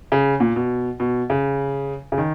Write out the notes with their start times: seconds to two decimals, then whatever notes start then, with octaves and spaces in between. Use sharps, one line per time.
0.12 C#3
0.40 A#2
0.56 B2
1.00 B2
1.30 C#3
2.12 C#3
2.18 D#3